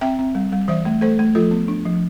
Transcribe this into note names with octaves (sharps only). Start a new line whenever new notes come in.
C4 E5 G5
C4
G3
G3
E3 C5 E5
A3
A3 A4 C5
A3
F3 F4 A4
B3
D4
F3